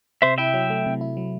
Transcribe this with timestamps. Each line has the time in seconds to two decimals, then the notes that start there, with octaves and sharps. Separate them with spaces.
0.22 C3 C5 E5
0.38 E4 E5 G5
0.54 F#3
0.70 A3
0.86 C3
1.01 E4
1.17 F#3